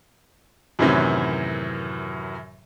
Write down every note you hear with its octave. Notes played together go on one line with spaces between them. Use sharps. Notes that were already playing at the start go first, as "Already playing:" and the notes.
F#2 A2 C3 D#3 E3 F#3